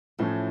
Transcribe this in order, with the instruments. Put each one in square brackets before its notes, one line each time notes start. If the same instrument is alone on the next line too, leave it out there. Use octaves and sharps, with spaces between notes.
[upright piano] A2 F3 A3 C#4 [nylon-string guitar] E3